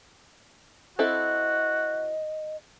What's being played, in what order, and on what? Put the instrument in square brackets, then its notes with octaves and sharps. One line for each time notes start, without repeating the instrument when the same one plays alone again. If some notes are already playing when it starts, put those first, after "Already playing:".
[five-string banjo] C4 E4 A4 [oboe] F#4 [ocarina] D#5